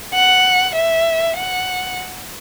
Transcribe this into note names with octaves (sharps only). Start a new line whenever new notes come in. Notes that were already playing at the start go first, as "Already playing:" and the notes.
F#5
E5
F#5